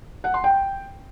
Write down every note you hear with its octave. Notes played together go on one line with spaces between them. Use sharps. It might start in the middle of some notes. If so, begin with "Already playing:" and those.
F#5
C6
G5